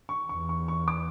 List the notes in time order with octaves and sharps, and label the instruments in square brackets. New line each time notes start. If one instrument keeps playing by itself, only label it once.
[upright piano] C#6
[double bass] E2 [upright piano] C#6
[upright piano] C#6
C#6
D6